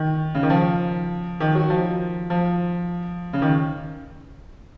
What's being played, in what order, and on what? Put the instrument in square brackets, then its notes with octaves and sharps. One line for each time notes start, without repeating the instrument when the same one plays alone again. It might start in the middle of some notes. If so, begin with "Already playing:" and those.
Already playing: [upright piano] D#3
C#3
D#3
F3
D#3
F#3
F3
F3
C#3
D#3